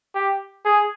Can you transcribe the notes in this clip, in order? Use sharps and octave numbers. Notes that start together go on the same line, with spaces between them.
G4
G#4